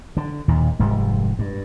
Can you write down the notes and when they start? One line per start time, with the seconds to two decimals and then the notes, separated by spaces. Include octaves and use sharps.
0.17 D3
0.48 D#2 A#2 D#3
0.79 F1 G#2 G3
1.39 G2